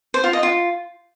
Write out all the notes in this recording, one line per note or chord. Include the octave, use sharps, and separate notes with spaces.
C5
F4
D#5
F4